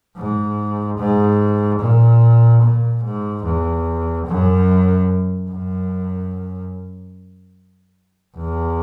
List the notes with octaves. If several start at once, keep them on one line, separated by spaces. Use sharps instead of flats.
G#2
G#2
A#2
A#2
G#2
E2
F#2
F#2
E2